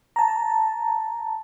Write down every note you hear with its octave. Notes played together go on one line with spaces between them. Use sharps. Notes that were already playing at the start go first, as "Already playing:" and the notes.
A5 A#5